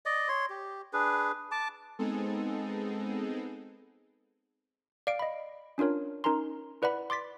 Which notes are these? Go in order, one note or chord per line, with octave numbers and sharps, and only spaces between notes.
D5 D#5
C#5 C6
G4
D4 G#4 B4
A5 D6
G#3 B3 C4 D#4 G#4 A4
D5 F5 D7
D#5 B5
C#4 D4 F4 A#4 C#5
C#4 D#4 A#4 G#5 A#5 C6
E4 B4 D5 F#5 B5
C6 D6 A6 B6